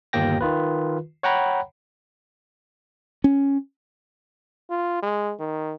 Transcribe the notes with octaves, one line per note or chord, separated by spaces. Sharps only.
G1 D#2 A#3 G5 A#6
D#3 F4 B4
C#5 F#5 G5 A#5 B5
C#4
F4
G#3
D#3